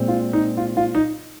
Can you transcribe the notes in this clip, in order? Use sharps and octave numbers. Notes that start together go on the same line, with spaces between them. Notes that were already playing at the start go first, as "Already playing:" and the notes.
Already playing: A#2 G#3 C4
F4
D#4
F4
F4
D#4